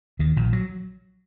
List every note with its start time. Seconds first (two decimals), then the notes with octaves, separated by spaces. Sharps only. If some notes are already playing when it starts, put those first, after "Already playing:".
0.19 D#2 D#3
0.36 A#1 A#2
0.53 F#3